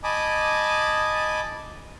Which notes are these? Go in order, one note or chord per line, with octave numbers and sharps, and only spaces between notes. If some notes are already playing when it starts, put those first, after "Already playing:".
D#5 G#5 A5 B5 D6 D#6